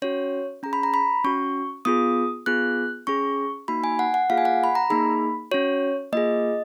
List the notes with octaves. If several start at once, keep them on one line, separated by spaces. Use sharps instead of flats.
C#4 F#4 C#5
C#4 G#4 A#5
B5
A#5
B5
C#4 F#4 C#6
B3 F4 G#4 D#6
B3 F4 G#4 F#6
C#4 G#4 C#6
A#3 D#4 F#4 B5
G#5
F#5
F#5
A#3 F4 G#4 F5
G#5
F#5
B5
A#5
A#3 D#4 G#4 B5
C#4 F#4 C#5
A#3 F4 G#4 D#5